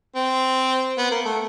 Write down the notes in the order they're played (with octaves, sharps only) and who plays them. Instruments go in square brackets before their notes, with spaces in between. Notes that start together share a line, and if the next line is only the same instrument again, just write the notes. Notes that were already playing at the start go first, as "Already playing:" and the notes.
[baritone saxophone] C4
B3
A#3
A3